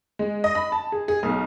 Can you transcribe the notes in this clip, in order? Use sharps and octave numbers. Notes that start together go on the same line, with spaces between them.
G#3
D#5
B5
A5
G#4
G#4
B1